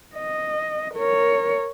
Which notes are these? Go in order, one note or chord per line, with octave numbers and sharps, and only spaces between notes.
D#5
A#4 C#5